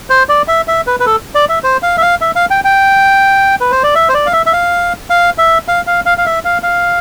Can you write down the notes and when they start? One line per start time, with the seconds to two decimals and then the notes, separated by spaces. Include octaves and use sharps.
0.10 C5
0.29 D5
0.48 E5
0.68 E5
0.87 B4
1.00 B4
1.06 A4
1.35 D5
1.49 E5
1.64 C5
1.83 F5
1.97 E5
2.02 F5
2.21 E5
2.35 F5
2.50 G5
2.64 G5
3.61 B4
3.71 C5
3.83 D5
3.95 E5
4.09 C5
4.14 D5
4.26 F5
4.33 E5
4.46 E5
4.53 F5
5.10 F5
5.38 E5
5.68 F5
5.87 F5
6.06 F5
6.18 F5
6.26 E5
6.45 F5
6.63 F5